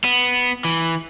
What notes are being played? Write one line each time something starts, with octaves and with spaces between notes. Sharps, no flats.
B3
E3